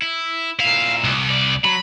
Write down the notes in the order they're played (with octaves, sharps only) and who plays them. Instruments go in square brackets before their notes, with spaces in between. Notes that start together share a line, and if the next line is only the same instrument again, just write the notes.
[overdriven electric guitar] E4
[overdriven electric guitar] A#2 E4 [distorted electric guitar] F5
[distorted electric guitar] C2
[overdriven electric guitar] D5
[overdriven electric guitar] F#3 [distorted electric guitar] B5